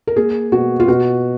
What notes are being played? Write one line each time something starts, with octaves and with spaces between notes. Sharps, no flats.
A#4
A#3 G#4
B2 F#4
F4
B2 F#4